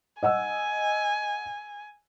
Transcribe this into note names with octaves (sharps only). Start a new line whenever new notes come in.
D#5 F#5 G#5 E6